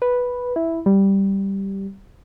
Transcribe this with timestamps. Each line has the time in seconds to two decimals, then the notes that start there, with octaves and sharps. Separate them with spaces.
0.02 B4
0.56 E4
0.86 G3